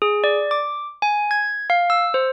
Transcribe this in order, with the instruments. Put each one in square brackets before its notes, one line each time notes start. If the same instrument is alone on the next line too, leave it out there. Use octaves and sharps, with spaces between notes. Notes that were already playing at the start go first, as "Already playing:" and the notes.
[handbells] G#4
D5
D6
G#5
G#6
F5
E6
C5